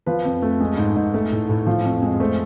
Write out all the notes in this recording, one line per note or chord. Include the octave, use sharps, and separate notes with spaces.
F3 B4
F2
A3
G#3
G#2
G#2
A3
A2
A2
F3
F2
G#3
A3 C5